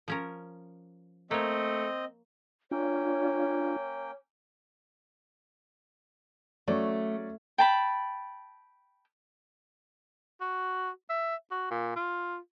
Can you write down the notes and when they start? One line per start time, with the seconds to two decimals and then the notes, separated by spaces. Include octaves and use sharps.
0.08 F3 C#4 A#4
1.31 A3 A#3 C4 C#5 D#5
2.71 A#3 C#4 D4 F4 C#5 G5
6.68 F#3 A3 C#4 D5
7.58 G5 A5 B5
10.41 F#4
11.10 E5
11.51 F#4
11.71 A#2
11.96 F4